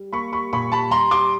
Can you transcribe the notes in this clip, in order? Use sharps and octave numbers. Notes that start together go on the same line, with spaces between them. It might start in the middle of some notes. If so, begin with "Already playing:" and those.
Already playing: G3
A#3 B5 C#6
G3 B5 C#6
A#2 B5 C#6
G3 A5 B5
G3 A#5 C6
G3 C6 D6